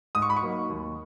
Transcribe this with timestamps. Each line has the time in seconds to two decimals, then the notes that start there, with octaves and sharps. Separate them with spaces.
0.15 G#2 D#6
0.22 C#6
0.30 B5
0.37 C#6
0.42 F#3 A#3 D#4
0.69 D#2